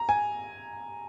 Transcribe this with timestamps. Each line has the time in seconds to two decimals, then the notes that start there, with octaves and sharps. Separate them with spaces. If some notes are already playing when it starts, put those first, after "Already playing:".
Already playing: A#5
0.09 G#5